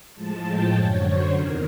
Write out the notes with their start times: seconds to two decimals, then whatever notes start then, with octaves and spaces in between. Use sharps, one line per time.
0.15 A2 F3 G#3 A5
0.44 G5
0.73 F#2 D3 F#3 C#5
1.03 C5
1.32 E2 C3 D#3 A#4